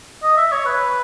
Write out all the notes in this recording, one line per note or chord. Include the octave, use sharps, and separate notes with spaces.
D#5
E5
C#5
B4